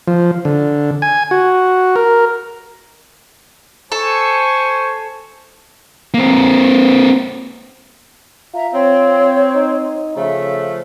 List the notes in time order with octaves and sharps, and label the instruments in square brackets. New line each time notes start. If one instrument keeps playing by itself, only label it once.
[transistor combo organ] F3
D3
G#5
F#4
A#4
[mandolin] A4 [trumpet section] C5 G#5 C#6
[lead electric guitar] A#3 C4
[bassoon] F4 [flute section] E5 A#5
[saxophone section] C4 [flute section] C#5
[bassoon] D#4
[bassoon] C#3 [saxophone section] F3 A3 [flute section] E5